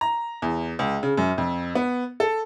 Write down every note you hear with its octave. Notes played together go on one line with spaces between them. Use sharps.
A#5
E2
C#2
C#3
F#2
F2
B3
A4